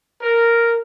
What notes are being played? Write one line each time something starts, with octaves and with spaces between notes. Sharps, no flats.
A#4